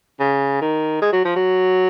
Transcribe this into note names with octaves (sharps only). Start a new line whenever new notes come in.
C#3
D#3
G#3
F#3
F3
F#3